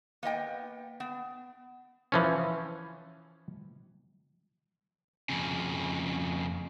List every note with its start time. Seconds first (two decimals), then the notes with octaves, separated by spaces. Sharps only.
0.23 A#3 B3 D#5 G5
1.00 B3
2.12 E3 F3 C#4
5.29 F2 C#3